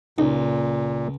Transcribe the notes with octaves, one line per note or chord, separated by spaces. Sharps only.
C#2 A#2 D#4